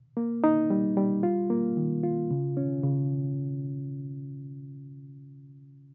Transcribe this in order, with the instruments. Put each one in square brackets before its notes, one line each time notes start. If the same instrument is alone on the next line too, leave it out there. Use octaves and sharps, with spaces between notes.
[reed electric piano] A#3
D#4
G3
G3
F4
A#3
D#3
F4
C#3
C#4
C#3